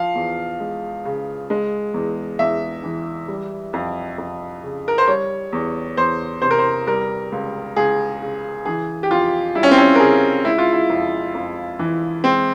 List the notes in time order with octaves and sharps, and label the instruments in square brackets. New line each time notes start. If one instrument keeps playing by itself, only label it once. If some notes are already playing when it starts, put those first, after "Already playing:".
Already playing: [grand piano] F3 F5
E2
G#3
C#3
G#3
E2
E2 E5
E3
G3
F2
F2
C#3
A#4
C5
G3 C#5
E2
E2 C5
C3 C5
A#4
C5
G3 A#4
C#2
C#2 G#4
C#3
E3 G#4
G4
F2 F4
G3 E4
C#4
C4
C#4
A#4
C#3 G#4
G#3 E4
F4
E4
F2
F2
E3
G#3 C4